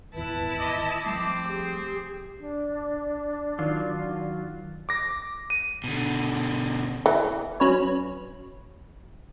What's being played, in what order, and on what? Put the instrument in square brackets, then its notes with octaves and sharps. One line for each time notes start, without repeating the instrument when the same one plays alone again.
[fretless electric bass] D#1 G#1 E2 [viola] E4 A5 [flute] B4
[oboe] D#5 [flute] D6
[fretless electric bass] F3 G3 A3 [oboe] C4
[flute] G4 [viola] G#4
[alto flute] D4
[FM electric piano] D#3 [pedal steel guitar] F#3 F4
[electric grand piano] D6 A#6
D#7
[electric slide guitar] B2 D3
[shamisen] E3
[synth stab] F#3 C#4 B4 C#5